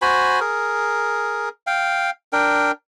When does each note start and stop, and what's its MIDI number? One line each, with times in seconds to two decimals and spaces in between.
0.02 0.40 66
0.02 0.40 72
0.02 0.40 80
0.02 0.40 83
0.41 1.49 68
0.41 1.49 70
1.67 2.10 77
1.67 2.10 79
2.33 2.71 62
2.33 2.71 70
2.33 2.71 79